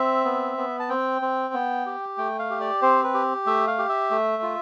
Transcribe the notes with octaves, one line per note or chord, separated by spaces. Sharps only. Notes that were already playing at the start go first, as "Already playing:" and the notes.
Already playing: C4 E5
B3
B3
A5
C4 G5
C4
B3
G4
A3 G5
F5
G4
D5
C4 C5
B4
G4
A3 E5
F5
G4
E5
A3
F4